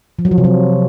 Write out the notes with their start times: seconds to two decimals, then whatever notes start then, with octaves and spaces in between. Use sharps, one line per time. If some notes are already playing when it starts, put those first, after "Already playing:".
0.19 F3
0.25 F#3
0.31 F3
0.38 C3
0.44 F#3